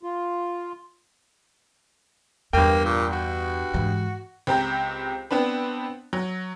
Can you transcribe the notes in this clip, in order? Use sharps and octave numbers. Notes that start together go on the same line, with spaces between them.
F4
E2 G2 A#3 G5
A#2
F#4
G#2 E3
C#2 C4 G4 A#5 G6
B3 C4 D4 B4
F#3